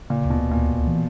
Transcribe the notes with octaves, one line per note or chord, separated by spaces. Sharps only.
A#2 C#3
D2
B2
D2
A#2
D2
C#2
E3